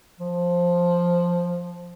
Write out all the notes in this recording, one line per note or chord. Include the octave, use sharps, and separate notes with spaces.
F3